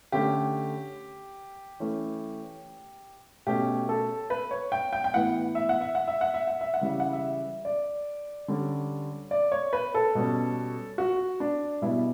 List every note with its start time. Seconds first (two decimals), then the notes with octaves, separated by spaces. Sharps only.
0.12 D3 A3 C#4 G4
1.80 E3 A3 C#4
3.47 B2 A3 C#4 G4
3.89 A4
4.30 B4
4.51 C#5
4.72 G5
4.93 G5
5.04 G5
5.14 A2 E3 B3 F#5
5.55 E5
5.69 F#5
5.81 E5
5.95 F#5
6.08 E5
6.21 F#5
6.34 E5
6.47 F#5
6.61 E5
6.74 F#5
6.81 C#3 E3 G3 E5
7.00 F#5
7.13 E5
7.65 D5
8.48 D3 G3 C#4
9.31 D5
9.52 C#5
9.73 B4
9.94 A4
10.15 B2 G3 C#4
10.98 F#4
11.40 D4
11.82 B2 G3 B3 E4